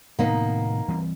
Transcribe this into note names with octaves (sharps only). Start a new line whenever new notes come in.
A2 C3 D#3 A#3 B3 D#4
E3 G3 C4